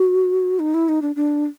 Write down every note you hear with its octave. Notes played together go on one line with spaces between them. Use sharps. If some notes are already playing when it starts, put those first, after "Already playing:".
Already playing: F#4
D#4
E4
D#4
D4
D4